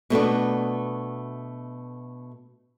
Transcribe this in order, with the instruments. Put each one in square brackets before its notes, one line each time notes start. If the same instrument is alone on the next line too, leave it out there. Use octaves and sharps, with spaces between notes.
[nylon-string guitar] B2 A3 B3 D4